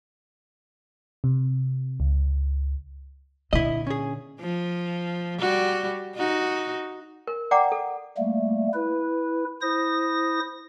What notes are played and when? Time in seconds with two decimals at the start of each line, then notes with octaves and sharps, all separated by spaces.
1.24 C3
2.00 C#2
3.53 A#2 D3 E4 D#5
3.87 C#4 G#4
4.40 F3
5.39 G3 F#4
6.16 D#4 F#4
7.27 A#4
7.51 D5 F#5 G5 A#5 D6
7.72 A4
8.17 G3 A3 A#3
8.74 E4 B4
9.61 E4 C5 D#6 A#6